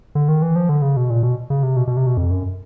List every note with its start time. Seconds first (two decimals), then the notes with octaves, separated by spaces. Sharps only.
0.15 D3
0.29 D#3
0.42 E3
0.56 F3
0.69 D3
0.82 C#3
0.97 B2
1.10 A#2
1.23 B2
1.50 C#3
1.63 C3
1.77 B2
1.87 B2
1.97 C3
2.07 B2
2.17 F2
2.31 F#2